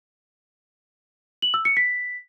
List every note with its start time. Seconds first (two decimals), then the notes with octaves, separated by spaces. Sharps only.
1.42 F#7
1.54 E6
1.65 C#7
1.77 B6